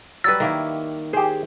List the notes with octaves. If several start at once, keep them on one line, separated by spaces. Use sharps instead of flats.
F#3 G3 B4 E6 A6
D#3 A#3 E4
G4 G#4 C5